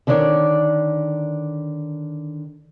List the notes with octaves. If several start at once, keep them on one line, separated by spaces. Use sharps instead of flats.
D3 D#3 D4 E4 C#5 D5